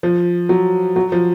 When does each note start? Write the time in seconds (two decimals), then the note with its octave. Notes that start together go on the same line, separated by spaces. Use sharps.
0.03 F3
0.49 F#3
0.96 F#3
1.12 F3